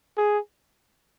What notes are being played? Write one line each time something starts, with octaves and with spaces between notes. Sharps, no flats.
G#4